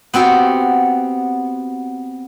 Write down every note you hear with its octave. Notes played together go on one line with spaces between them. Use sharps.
B3 C4 F#4 G4